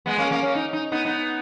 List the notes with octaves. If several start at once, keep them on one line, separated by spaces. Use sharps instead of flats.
G#3 B3
A#3 C#4
A#3 C#4
A#3 C#4
D#4
D#4
B3 D#4
B3 D#4